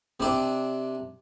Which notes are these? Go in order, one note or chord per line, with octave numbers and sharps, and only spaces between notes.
C3 D4